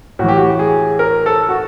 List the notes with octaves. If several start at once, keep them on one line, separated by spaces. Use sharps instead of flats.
A2 E3 F#4 G4
F#4
G#4
A#4
A4
F#4